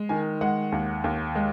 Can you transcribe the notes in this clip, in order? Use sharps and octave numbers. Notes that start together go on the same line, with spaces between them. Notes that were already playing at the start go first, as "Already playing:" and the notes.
Already playing: G#3
D#3 G#5
G#3 F#5
D#2
D#2
G#3